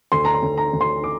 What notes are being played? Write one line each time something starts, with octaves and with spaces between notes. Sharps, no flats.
D2 C6
A#5
C6
D2
A#5
D2
C6
D6